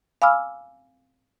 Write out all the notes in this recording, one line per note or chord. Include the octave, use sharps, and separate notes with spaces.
F5 G#5 B5 D6 E6 F6